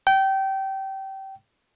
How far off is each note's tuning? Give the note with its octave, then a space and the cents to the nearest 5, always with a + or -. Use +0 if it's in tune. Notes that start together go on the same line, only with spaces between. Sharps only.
G5 -25